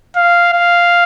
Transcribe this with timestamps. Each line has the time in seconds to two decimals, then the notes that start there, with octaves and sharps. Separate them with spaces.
0.16 F5
0.53 F5